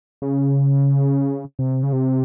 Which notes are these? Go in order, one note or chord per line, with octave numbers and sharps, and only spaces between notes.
C#3
C3
C#3
C3